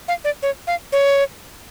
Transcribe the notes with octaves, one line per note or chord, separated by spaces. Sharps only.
F5
D5
C#5
F5
C#5